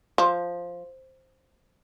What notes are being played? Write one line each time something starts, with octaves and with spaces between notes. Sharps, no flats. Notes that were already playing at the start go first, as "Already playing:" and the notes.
F3